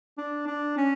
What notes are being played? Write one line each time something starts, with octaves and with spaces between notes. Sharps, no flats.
D4
D4
C#4